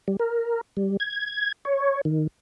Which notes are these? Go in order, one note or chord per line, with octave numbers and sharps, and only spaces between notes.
G3
A#4
G3
G#6
C#5
D#3